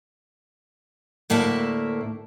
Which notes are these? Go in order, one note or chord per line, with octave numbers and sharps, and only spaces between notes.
D2 A2 A#3 E5 A5